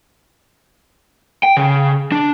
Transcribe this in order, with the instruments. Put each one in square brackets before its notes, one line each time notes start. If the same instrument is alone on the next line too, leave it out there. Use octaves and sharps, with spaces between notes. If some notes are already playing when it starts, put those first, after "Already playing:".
[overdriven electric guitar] G5
C#3
D4